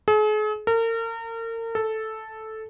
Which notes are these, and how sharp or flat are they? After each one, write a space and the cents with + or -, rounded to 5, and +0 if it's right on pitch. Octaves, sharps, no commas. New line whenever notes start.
G#4 +45
A#4 -35
A4 -5